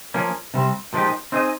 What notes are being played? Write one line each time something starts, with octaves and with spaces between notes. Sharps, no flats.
F3 A#3 C#4
C3 G3 C4
A#2 F3 G#3 D#4 G4
C4 D#4 G#4 D#5